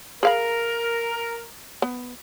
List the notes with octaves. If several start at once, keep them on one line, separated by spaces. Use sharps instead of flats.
G#4 A#4 F5 B5
B3